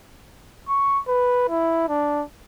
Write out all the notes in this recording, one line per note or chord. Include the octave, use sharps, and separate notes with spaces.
C#6
B4
E4
D4